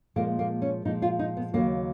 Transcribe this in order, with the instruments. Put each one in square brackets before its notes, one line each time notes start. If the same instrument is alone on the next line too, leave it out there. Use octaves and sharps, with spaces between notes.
[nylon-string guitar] A#2 F3 G#3 A#3
A#3
C#4
A#2 F3 G#3 D#4
F4
D#4
B3
D#2 C#3 F#3 A#3